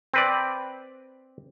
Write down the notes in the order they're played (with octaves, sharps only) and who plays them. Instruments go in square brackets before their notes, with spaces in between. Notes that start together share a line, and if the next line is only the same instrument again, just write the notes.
[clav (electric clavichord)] C4 B4 D5